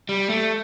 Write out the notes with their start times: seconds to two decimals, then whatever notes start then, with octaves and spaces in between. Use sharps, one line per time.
0.09 G3
0.30 A3